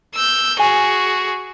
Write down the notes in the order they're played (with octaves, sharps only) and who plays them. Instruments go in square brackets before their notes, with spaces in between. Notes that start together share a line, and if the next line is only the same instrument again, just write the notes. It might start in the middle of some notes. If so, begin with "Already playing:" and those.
[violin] E6 G6
[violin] F#4 G#4 [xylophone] G#5